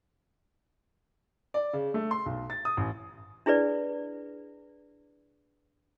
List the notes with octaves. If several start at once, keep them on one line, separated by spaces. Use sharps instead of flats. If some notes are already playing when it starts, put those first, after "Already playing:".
D5
C#3
A3
C6
B1
A6
D#6
A1
D4 E4 G#4 B4 D5